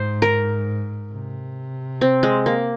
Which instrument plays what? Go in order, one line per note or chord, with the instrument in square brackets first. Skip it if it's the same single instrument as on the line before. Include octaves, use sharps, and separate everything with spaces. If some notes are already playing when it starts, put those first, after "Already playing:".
Already playing: [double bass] G#2 [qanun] C5
[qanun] A#4
[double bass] C3
[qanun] C4
G#3
A#3